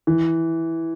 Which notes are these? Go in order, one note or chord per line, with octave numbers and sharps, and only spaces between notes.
E3